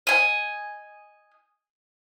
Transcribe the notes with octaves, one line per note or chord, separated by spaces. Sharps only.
D#5 G#5